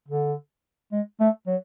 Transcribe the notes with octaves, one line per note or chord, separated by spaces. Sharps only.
D3
G#3
A3
F#3